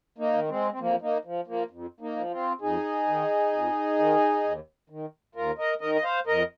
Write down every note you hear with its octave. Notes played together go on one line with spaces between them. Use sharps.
A#3 D#4
D#3
G#3 C4
C4
F2 F3 A#3
A#3 D#4
F3
F3 A#3
F2
A#3 D#4
F3
C4 F4
F2 D#4 G#4
D#3
F2
D#3
D#2
D#3
D#2 F4 A#4
A#4 D#5
D#3 A#4 D#5
D#5
C5 F5
F2 A#4 D#5